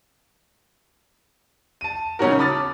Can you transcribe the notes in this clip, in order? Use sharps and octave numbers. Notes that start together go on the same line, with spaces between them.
A5 D#7
C#3 F#3 C#4 D#4 F#4 A#4
A5 B5 D6 D#6 F6 A6